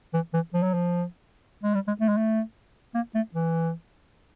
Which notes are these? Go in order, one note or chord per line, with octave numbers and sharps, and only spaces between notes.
E3
E3
F3
F#3
F3
G#3
G3
G#3
A3
G#3
A3
A#3
A3
E3